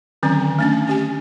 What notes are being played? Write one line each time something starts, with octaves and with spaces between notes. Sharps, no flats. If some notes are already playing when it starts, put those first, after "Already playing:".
D3 D#3 F#3 C4 C#4
A3 C#4 D4
C#4 G4 G#5